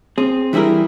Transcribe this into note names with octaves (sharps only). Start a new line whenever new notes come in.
C4 G#4
E3 G3 E4 G#4 A#4